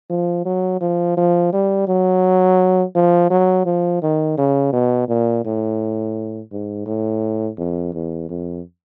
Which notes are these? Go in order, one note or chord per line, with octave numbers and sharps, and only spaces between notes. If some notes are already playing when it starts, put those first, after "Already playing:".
F3
F#3
F3
F3
G3
F#3
F3
F#3
F3
D#3
C#3
B2
A#2
A2
G#2
A2
F2
E2
F2